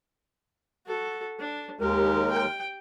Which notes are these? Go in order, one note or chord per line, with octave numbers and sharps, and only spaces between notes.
F#4 A4
D4
D#2 G#3 G4 A#4
G5